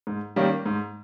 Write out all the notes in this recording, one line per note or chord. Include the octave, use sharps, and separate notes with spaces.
G#2
D#3 G3 A#3 C#4
G#2